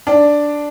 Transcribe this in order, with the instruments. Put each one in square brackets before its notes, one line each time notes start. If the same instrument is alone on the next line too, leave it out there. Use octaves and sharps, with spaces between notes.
[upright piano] D4